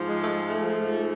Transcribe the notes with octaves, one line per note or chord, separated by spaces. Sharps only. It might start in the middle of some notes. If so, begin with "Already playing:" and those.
Already playing: G#2 F3
G#3
A3
G#3
A3
G#2 F3